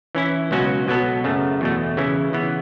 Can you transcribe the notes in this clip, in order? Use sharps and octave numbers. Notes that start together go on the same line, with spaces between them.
E3 C#4 E4
C#2 B2 F#3 C#4 F#4
B2 F#3 B3 A4
F#2 C#3 A3
E2 B2 A3
C#3 E3 C#4 E4
C#3 E3 B3